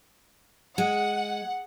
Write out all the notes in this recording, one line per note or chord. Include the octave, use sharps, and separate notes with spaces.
G#3 F#5